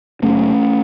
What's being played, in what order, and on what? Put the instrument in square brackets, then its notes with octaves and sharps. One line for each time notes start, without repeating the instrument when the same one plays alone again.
[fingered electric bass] F#1 F#2 C#3 A3 C#4